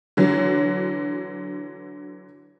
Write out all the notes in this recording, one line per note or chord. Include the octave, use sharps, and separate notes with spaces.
D3 E3 F#3